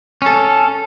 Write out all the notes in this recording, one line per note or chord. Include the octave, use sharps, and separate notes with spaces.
C#4 A4